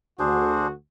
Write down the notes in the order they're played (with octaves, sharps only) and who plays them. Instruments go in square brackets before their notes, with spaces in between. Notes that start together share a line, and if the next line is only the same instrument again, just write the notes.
[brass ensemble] D2 F#4 [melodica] D4 G#4 C5